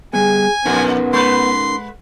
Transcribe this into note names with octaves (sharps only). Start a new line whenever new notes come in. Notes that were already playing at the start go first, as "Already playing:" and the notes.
G3 B3 G#4 G#5
F2 B3 C#4 D#4 A#4
G#3 B4 C6